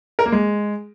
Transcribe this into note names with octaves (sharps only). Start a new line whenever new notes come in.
A#4
A#3
G#3